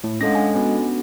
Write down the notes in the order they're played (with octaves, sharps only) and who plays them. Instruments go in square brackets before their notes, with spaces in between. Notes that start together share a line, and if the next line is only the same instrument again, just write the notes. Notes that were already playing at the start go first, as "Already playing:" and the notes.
[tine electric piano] A2
[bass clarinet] G#3 [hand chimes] C#4 A4 [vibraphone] D4 F5 F#5 [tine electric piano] A#6
[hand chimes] G#5
[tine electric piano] B3 C#4 [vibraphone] D4 F#4 A4